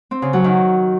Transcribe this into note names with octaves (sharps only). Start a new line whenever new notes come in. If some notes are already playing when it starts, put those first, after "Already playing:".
C4
C#3
F#3
D#3